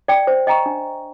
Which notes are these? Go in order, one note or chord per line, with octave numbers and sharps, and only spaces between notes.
D5 G5
C5
D#5 G5 A#5 C#6
D4